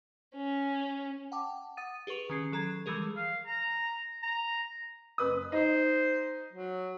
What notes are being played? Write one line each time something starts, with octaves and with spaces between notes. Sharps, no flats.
C#4
F#5 G5 A5 D6
F#5 D#6 A6 D#7
G4 G#4 B4 C#6 F7
D#3 C#4 C7
F#3 A4 A#5 G#6 C7
E3 G3 G#3 G#4 A#4
F5
A#5
A#5
F#1 B4 D#6
D#4 C5 D#5
F#3